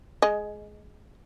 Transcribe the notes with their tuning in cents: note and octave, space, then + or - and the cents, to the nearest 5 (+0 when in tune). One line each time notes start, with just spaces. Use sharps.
G#3 +15 D#5 +0